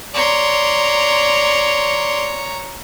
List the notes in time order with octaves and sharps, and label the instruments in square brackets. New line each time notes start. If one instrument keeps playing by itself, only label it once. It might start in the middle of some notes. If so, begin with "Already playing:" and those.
[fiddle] C#5 A#5 [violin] D5 C6